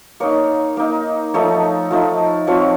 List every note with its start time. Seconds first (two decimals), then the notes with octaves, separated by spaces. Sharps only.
0.20 A#3 D#4 C#5
0.77 A#3 D#4
1.34 F3 A3 D#4 C#5
1.91 F3 A3 D#4
2.47 F3 C4 F4 C#5